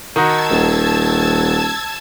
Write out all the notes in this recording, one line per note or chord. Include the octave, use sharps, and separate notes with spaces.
D#3 D#4 F#4 A5 E6 G#6
D#1